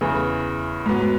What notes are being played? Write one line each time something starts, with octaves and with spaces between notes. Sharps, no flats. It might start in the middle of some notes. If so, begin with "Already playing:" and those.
E2 C#3 E3
G#2 F#3 B3